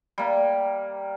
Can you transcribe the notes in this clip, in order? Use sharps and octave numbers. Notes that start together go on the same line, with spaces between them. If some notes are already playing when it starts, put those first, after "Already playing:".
G3 A#3